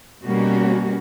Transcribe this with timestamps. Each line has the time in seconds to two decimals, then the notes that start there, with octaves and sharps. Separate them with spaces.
0.24 B2 G3 A#3 C#4 F#4